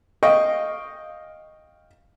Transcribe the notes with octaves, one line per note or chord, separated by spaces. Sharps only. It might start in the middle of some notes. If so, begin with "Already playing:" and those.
D#5 F5 G5 C#6